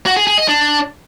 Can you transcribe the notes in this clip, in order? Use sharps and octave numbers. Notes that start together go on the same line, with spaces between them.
F#4
G#4
G#4
D#5
D4